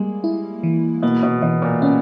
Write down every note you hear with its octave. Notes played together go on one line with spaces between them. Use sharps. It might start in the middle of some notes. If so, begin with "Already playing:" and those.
Already playing: G3 G#3 A#3
E4
E3
B2 A#3
B2
B2 E3
A#2
B2 C#4